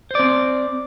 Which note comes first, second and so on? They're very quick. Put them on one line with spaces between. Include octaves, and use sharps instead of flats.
C5 D5 C4